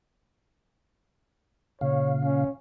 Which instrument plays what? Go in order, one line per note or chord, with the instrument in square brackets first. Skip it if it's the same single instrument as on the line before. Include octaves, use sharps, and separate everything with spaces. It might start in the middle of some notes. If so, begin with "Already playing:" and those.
[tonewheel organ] A#2 C#3 F5 [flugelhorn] C#5
[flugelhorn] C#4